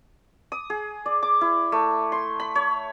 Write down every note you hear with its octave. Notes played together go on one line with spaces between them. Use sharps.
D#6
G#4
D5
D6
E4
A3
C6
B5
C#5